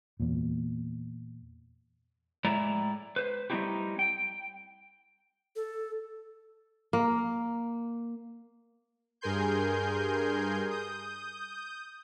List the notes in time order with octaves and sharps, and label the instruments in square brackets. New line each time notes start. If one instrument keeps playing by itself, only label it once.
[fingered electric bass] E2 A#2
[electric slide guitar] A2 G#3 E4 D5 A#5
B4 C5
G3 A3 C4 D#4 E4 G4
G5
[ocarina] A4
[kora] A#3
[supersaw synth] G2 G#4 A#4 G#5 C6 G6
D#6 G6